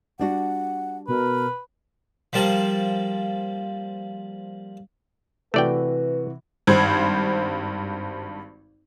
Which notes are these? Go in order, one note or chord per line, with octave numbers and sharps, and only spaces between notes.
G3 D4 F#4 F#5
B2 A#4 B4
F3 G3 A#3 A5
C3 E3 A3 F#4 B4 D5 G5
G#1 G2 C5 G#6